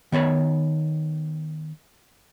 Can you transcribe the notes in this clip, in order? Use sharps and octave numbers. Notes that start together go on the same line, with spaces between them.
D#3 B3 C#5 B5